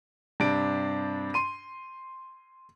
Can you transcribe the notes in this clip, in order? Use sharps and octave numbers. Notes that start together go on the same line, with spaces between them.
G2 C3 D4 D7
C6 D#7